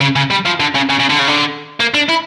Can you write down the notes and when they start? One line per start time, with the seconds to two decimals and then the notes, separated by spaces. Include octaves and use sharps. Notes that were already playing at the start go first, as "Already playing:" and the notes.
0.01 C#3
0.16 C#3
0.31 G3
0.46 F3
0.60 D3
0.75 C#3
0.90 C#3
1.00 C#3
1.10 D3
1.19 C#3
1.28 D3
1.80 A#3
1.94 D4
2.09 E4